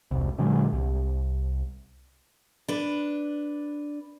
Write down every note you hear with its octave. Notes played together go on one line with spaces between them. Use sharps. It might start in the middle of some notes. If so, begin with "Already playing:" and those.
E1 C2
A#2 D3 F#3 G#3
C2
D4 B4